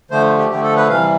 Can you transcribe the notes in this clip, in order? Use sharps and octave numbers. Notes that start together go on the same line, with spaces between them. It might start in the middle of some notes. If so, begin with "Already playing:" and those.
D3 F3 A3 C5
G4
D3 F3 A3 G4
A4
B4
C3 E3 G3 F5